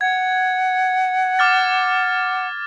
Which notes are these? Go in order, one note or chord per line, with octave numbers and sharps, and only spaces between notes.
F#5 G#6
D6 F6 A6